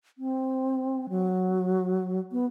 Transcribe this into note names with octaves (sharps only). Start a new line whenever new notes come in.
C4
F#3
B3